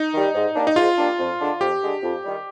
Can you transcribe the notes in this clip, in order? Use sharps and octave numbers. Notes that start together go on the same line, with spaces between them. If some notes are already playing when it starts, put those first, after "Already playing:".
Already playing: D#4
D#3 G3
G#2
G3 A#3 D4
D#4
G#2 F4
G3 A#3 D4
F2
D3 G#3 D4
F2 G4
D3 G#3 D4
F2
D#3 G3